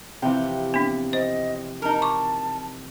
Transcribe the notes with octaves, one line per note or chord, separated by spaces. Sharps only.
C3 E3 F3 G4
B3 D4
C5 D#5
D#4 A#4 A5
C#6 D6